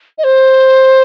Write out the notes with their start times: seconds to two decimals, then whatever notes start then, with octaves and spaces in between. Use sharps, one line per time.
0.18 D#5
0.24 C5